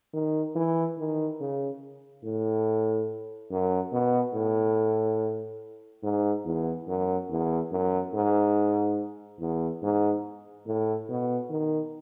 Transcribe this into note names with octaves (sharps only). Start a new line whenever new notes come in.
D#3
E3
D#3
C#3
A2
F#2
B2
A2
G#2
E2
F#2
E2
F#2
G#2
E2
G#2
A2
B2
D#3